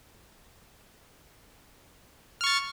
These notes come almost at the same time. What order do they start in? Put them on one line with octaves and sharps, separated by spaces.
F6 C#6 A6